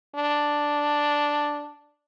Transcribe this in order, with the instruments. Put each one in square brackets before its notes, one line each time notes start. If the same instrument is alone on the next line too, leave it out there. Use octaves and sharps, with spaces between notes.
[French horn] D4